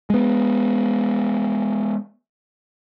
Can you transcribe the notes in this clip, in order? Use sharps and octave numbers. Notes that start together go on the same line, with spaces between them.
G#3 B3